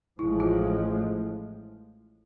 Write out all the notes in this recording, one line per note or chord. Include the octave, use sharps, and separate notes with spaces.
A1 A2 F3 G#3 E4
F4